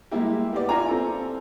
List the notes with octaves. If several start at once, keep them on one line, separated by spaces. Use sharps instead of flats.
G3 G#3 A#3 E4 G4
B3 G4 D5
E4 F4 G#5 A#5
C4 A4